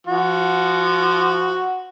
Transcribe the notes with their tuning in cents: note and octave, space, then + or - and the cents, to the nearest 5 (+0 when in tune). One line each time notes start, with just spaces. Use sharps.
F3 -20 F#4 +0